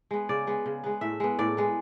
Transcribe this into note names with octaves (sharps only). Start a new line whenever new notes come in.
G#3 B3
C#3 D5
G#3 B3
C#3
G#3 B3
A2 E5
G#3 B3
A2 D5
G#3 B3